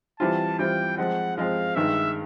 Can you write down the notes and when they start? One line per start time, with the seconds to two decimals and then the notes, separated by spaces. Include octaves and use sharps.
0.19 E3 G3 C4 F4 A5
0.59 E3 G3 C4 F4 G5
0.97 F3 G#3 C4 F#5
1.37 F3 G#3 C4 F5
1.75 G2 D#3 G#3 E5